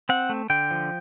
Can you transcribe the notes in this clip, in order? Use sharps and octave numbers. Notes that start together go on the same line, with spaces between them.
C4 F#5
A3
D3 G5
F3